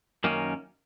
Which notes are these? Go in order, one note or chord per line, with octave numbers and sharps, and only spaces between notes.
F#2 D#3 A#3 C#4